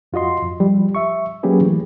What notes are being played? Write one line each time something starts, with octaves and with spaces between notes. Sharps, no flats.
F2 F4 F#4 D#5 C6
F2
F3 G3
E5 C#6
F#3 A#3 C#4 G4 G#4 B4
E3 A3